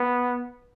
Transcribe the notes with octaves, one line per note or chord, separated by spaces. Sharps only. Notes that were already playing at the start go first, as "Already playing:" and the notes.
Already playing: B3